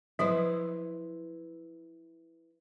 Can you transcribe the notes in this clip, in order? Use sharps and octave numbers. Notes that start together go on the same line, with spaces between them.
F3 F#3 E4 B4 C5